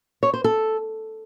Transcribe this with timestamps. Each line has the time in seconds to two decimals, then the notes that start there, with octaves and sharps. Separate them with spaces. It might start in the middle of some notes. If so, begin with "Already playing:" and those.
0.23 C#5
0.34 C5
0.44 A4